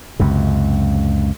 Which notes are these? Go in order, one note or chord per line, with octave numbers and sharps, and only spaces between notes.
C#2 F#2 C3